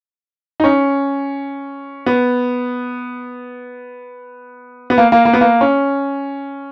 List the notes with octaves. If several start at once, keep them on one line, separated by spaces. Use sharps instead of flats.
D#4
C#4
B3
B3
A#3
A#3
A#3
B3
A#3
C#4